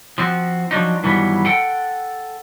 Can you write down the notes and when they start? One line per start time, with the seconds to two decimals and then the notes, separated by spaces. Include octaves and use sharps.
0.18 F3 C4 F#4
0.71 F3 F#3 D4 D#4
1.03 G2 D#3 E3 F#3 G3 B3
1.46 A4 F#5 G5